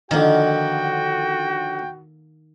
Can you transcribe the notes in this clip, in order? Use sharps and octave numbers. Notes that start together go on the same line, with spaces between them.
D3 D#3 F3 A#3 F#4 G5